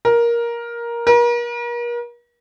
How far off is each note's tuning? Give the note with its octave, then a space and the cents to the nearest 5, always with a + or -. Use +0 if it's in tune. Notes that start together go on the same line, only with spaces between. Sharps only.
A#4 +10
A#4 +40